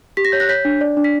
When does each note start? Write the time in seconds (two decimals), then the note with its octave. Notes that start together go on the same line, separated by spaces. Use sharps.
0.17 G4 B6
0.25 A#6
0.32 C#5 G6
0.40 F#6 A#6
0.49 C#5 G6 B6
0.65 D4
0.81 D5
0.97 D4
1.04 B6